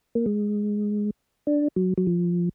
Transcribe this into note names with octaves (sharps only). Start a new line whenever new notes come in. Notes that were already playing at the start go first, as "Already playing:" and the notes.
A#3
G#3
D4
F#3
F#3
F3